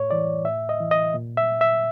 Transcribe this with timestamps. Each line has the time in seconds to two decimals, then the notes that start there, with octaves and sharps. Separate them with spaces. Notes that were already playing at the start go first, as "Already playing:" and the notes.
Already playing: A2 C#5
0.11 E3 D5
0.45 A2 E5
0.69 D#5
0.80 E3
0.91 D#5
1.14 A#2
1.37 E5
1.61 E5